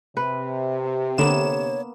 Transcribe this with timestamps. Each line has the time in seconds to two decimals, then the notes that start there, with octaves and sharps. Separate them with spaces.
0.17 C3 B4
1.18 D3 A#3 B3 C#5 E7